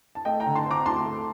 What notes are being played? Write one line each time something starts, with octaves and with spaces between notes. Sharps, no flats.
A5
A3 D#5 G5
G5 A#5
D3
A5 C6
C4 A#5 D6
D2 A5 C6
A3